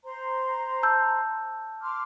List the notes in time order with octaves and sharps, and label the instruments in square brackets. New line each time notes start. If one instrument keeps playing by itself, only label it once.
[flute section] C5 A#5 C6
[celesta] A5 E6 G6
[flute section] C6 D6 F6